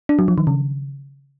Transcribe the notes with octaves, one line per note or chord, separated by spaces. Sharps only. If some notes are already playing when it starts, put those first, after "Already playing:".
D4
F#3
F3
D#3
C#3